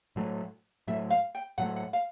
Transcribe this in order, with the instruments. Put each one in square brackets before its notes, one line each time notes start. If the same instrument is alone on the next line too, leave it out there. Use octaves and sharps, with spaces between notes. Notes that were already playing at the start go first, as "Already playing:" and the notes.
[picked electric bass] A2 F#3 A3
[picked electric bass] A2 F#3 A3 [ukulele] E5
[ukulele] F5
G5
[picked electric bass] A2 F#3 A3 [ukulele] F#5
[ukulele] F#5
F5